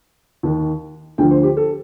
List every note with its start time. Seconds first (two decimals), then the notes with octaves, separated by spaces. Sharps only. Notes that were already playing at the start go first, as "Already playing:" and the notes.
0.43 D#2 D#3
1.18 D2 D3 F3 G5
1.31 C5
1.43 G4
1.57 A4